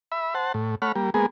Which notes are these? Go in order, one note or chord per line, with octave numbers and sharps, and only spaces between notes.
E5 B5
C5 F#5 A5
A2
A3 C#5 F#5 B5 F6
G3 A#3
G#3 A#3 B3 G#4